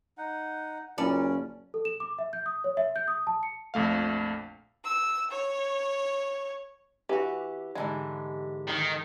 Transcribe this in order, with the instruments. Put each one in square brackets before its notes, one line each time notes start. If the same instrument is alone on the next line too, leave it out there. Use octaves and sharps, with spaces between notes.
[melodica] D#4 F#5
[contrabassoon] F#1 [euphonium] A#2 [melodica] C#4 [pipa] A4 B4 D5
[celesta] A4
E7
D6
E5
G6
D#6
C#5
E5
G6
D#6
A5
C#7
[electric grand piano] A#1 F2 A3 F5
[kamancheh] E6
C#5
[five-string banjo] E3 F#4 [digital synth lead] G4
[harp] G#2 D3 E3 [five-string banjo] G#3
[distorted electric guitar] D#3